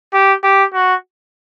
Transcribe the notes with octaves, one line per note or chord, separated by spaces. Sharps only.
G4
G4
F#4